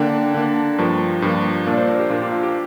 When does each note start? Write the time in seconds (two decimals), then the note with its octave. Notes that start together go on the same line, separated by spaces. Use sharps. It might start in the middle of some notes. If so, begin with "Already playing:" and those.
Already playing: D3 A#3 D4 G5
0.34 D3 A#3 D4
0.78 G2 F3 A#3
1.22 G2 F3 A#3
1.66 A#2 A#3 D4 F5
1.74 D5
1.78 C5
1.88 A#4
2.00 G4
2.10 A#2 A#3 D4 F4
2.22 G4
2.32 F4
2.43 G4